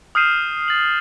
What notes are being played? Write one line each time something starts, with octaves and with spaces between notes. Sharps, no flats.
D#6 F6 G6 C7 D#7 E7
A6 F#7